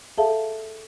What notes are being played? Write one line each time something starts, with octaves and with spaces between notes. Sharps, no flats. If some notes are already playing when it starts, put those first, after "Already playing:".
G#4 A4 E5 F5 A5